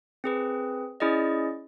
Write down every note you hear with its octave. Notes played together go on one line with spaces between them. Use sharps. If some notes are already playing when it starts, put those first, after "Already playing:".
C4 G#4 B4
C#4 E4 G#4 D5 D#5